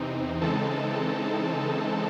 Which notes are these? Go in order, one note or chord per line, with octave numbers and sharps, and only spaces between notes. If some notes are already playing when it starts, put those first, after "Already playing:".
Already playing: E2 C3 E3 C4 D#4
C#3 E3 G#3 C4 D#4 A4 A5